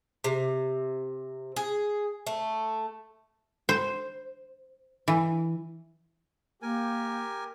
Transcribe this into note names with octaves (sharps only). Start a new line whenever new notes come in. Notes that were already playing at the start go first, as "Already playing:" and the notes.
C3
G#4
A3
C5
E3
A#3 G4 A#4 G#5